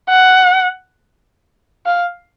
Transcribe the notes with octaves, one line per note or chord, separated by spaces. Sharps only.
F#5
F5